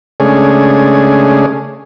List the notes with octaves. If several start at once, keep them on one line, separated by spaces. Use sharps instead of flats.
C#3 G#3 A3 C#4 D4 G#4